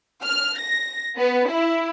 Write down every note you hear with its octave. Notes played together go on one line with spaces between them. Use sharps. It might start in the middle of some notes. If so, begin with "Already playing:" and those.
F6
A#6
B3
E4